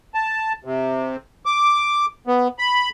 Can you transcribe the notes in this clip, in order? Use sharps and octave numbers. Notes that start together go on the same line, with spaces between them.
A5
C3
D6
B3
B5